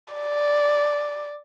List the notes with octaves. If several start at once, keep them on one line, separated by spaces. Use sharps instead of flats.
D5